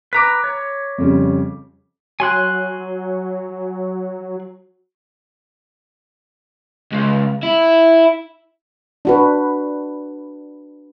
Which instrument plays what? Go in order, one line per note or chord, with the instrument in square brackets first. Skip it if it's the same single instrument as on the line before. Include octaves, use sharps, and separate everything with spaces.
[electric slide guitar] B4 A#5 [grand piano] B5 A#6 D7 [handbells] D6 B6
[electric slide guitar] C#5
[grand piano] F2 C#3 G3
[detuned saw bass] F#3 [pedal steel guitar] G#5 C6 F#6
[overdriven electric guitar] C#2
E4
[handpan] D4 F#4 B4